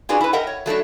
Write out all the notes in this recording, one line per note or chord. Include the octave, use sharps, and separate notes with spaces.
C#4 D4 F4 F#4 G#4 B4
E4 B4
A#4 D#5 E5 F#5 G5
C#5
F#3 A3 D4 F#4